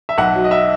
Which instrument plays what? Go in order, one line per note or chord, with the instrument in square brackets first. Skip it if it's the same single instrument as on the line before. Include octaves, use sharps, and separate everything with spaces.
[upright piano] E5
B1 F#5
F#3
D#5
E5